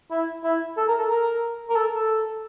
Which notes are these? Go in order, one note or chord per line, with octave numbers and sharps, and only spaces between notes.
E4
E4
A4
A#4
A4
A#4
A#4
A4
A4